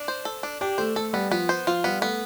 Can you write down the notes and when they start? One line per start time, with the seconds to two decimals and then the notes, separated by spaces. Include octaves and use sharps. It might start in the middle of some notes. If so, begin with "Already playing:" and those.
Already playing: D4
0.08 C5
0.25 A4
0.43 D4
0.61 D4 G4
0.78 A3 C5
0.96 A3 A4
1.13 G3 B3
1.31 F3 B3
1.49 C5
1.67 F3 F4
1.84 G3 B3
2.01 A3 B3